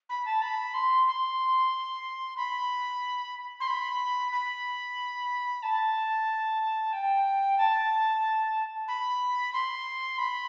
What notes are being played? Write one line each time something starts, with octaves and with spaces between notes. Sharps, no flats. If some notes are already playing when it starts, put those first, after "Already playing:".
B5
A5
B5
C6
C6
B5
C6
B5
B5
A5
G5
A5
B5
C6
B5